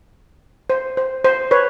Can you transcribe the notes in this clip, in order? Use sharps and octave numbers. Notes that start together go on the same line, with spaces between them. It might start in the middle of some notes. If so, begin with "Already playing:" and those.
C5
C5
C5
B4 C#5